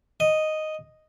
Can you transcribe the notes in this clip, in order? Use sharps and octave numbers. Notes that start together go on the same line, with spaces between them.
D#5